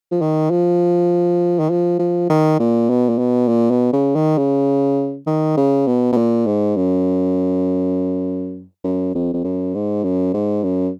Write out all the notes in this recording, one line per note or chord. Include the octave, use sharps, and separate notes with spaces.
F3
D#3
F3
D#3
F3
F3
D#3
A#2
B2
A#2
B2
A#2
B2
C#3
D#3
C#3
D#3
C#3
B2
B2
A#2
G#2
F#2
F#2
F2
F2
F#2
G#2
F#2
G#2
F#2